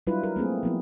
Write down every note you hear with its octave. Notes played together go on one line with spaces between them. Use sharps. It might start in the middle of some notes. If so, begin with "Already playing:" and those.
F#3 G3 D4 E4 F4 B4
A#4
A3 A#3 C4 G#4
F3 B3 E4